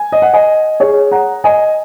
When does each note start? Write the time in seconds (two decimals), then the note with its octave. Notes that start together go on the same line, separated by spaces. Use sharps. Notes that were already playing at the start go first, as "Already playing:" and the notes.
Already playing: G#5
0.12 D#5
0.22 F#5
0.33 D#5 G#5
0.80 G#4 C#5
1.11 F#5 A#5
1.44 D#5 G#5